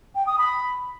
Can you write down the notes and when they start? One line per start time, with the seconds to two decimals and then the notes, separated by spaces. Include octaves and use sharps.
0.15 G5
0.27 D#6
0.38 B5